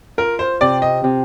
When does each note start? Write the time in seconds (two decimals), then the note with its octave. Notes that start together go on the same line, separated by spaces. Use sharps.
0.18 F4 A#4
0.39 C5
0.61 C3 D5
0.82 D#5
1.04 C3